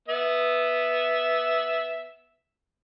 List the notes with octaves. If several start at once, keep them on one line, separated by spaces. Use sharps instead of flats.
B3 E5